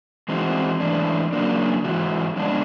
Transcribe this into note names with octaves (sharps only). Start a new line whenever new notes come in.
E3 G#3 C4 D#4 F#4
G#2 E3 A3 D4
C#3 F#3 A#3 D4
G#2 E3 F#4
D3 F3 G#3 B3 D4